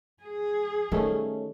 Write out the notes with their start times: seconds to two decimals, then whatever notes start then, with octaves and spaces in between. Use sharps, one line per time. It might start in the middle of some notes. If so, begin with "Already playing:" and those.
0.23 G#4
0.92 D#3 G3 A3 C#4